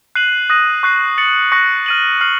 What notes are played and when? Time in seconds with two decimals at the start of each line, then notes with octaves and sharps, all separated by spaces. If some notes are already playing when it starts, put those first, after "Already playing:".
0.15 F#6 C7 D#7 F#7
0.50 D#6 F#6 A#6 D#7
0.83 C#6 F#6 C7
1.18 A6 C#7 F#7
1.52 C#6 F#6 A#6 C#7
1.86 F6 A6 D#7 F#7
2.21 F6 C7 F#7